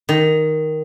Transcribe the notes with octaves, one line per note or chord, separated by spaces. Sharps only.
D#3